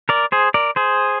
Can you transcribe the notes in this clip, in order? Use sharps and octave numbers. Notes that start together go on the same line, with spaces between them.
A#4 D5
G#4 C5
A#4 D5
G#4 C5